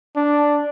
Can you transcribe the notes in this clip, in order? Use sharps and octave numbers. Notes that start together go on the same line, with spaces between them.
D4